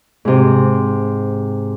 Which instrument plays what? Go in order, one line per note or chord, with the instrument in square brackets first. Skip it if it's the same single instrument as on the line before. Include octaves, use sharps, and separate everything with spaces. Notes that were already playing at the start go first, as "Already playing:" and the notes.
[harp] G#2 C3